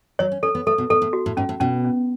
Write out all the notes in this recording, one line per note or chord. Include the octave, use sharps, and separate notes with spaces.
F#3 C#5
C#4
C#4 A4
B3
A3 A4
B2
A2 A4
A2
F#4
A2
G#2 C#4
A2
B2 C#4
C#4